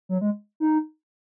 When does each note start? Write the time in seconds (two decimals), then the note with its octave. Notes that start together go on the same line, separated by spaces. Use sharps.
0.09 F#3
0.21 G#3
0.60 D#4